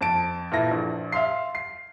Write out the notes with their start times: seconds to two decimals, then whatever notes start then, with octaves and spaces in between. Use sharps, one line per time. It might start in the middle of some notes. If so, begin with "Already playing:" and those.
0.01 F2 A5 D7
0.52 A#2 E3 E4 A4 A#6
0.71 A#1
1.12 E5 F5 C6 C7
1.55 C7